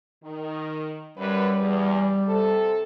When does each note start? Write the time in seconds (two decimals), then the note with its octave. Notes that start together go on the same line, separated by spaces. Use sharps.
0.24 D#3
1.18 F#2 G3 B4
1.60 E2
2.27 C3 A4